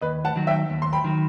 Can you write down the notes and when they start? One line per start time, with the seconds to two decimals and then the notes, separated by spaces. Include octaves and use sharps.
0.01 D#2 B4 D#5
0.25 F#5 A5
0.36 D#3 F#3
0.47 E5 G5
0.70 D#2
0.82 C6
0.93 G5 B5
1.04 D#3 F#3